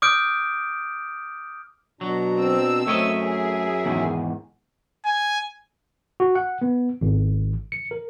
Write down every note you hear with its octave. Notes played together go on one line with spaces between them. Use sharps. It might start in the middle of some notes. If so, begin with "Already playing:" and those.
D6 D#6 F6 G6 D7
B2 F#3 D4 A#5
C4 E6
F#2 A3 A#4 C#5 D#5 E5
G#4
E2 G#2 D#3
G#5
F#4
F#5
B3
G#1
C#7
A#4